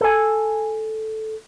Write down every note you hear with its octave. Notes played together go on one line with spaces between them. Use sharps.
A4 G#5